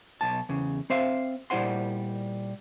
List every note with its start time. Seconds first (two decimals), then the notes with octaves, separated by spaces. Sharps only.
0.21 B1 A5
0.49 E2 C#3
0.90 C4 C5 E5 F5
1.50 A#2 G3 E4 C5 F#5 C6